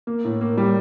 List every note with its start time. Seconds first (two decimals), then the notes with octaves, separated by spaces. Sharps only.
0.07 A#3
0.25 A2
0.41 A#3
0.58 G3